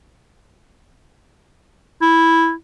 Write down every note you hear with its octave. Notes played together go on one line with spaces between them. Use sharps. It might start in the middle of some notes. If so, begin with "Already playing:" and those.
E4